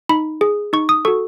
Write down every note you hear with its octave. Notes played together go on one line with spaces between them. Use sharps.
D#4 B5
G#4
D#4 C#6
D#6
F#4 A4 C#6